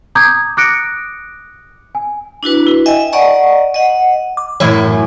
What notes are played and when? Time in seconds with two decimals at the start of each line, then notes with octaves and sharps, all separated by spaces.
0.15 A#5 D6 D#6 G6 G#6
0.57 D6 D#6 F#6 A#6 C#7 D7
1.95 G#5
2.43 D4 E4 F#4 B4
2.67 E4
2.86 D#5 E5 G5 G#5
3.13 D5 D#5 F#5 A#5 C#6
3.74 D#5 F#5
4.37 D6
4.60 F#2 A2 E3 E4 C#5